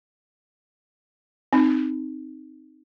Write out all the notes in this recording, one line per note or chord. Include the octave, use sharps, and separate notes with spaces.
C4 D#4